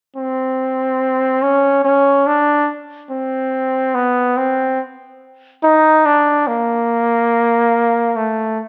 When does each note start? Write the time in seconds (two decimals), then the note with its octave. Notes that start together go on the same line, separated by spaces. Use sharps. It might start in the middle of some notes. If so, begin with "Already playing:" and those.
0.16 C4
1.42 C#4
1.85 C#4
2.27 D4
3.11 C4
3.95 B3
4.37 C4
5.63 D#4
6.06 D4
6.47 A#3
8.16 A3